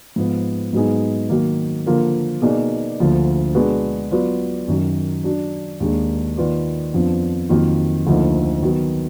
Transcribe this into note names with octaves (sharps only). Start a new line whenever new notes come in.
G#2 F3 B3
G#2 F#3 B3 D#4 G#4
D#3 F#3 A#3
D3 F3 A#3 F4 A#4
B2 A#3 D#4 G#4 D5
D2 D3 F3 A#3
B2 G#3 D4 F#4 B4
F#3 B3 F4 B4 D5
F#2 D#3 F#3
F#3 D4 F#4
D#2 D#3 G#3 D4
D#3 A#3 F4 B4 D5
F2 F3 B3 D4
F2 D#3 F#3 A#3 F4
D2 D3 F3 A#3 D#4
D#3 F#3 B3